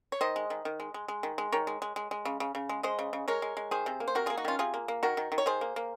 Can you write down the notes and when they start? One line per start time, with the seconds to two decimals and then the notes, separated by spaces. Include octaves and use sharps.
0.12 C#5
0.21 D#3 C5 D#5
0.36 G#3
0.50 D#3
0.65 D#3
0.80 G#3
0.94 G#3
1.08 G#3
1.23 D#3
1.38 G#3
1.52 D#3 A#4 C#5
1.67 G#3
1.82 G#3
1.96 G#3
2.11 G#3
2.25 C#3
2.40 C#3
2.55 C#3
2.69 G#3
2.83 G#3 C5 D#5
2.99 C#3
3.13 C#3
3.28 G#3 A#4 C#5
3.42 G#3
3.57 G#3
3.71 D#3 G#4 C5
3.86 C3
4.00 A#3
4.08 C5
4.15 C3 F#4 A#4
4.26 A#3 F4 G#4
4.37 D#4 F#4
4.45 D#3 C#4 F4
4.59 C3 F4 G#4
4.74 A#3
4.88 A#3
5.03 D#3 F#4 A#4
5.17 D#3
5.32 D#3
5.38 C#5
5.46 D#3 G#4 C5
5.61 A#3
5.76 A#3